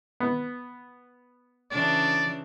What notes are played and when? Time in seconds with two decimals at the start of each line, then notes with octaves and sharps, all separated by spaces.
0.20 B3
1.71 C#3 E3 D4 D5